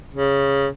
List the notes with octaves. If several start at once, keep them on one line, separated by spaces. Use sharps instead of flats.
C#3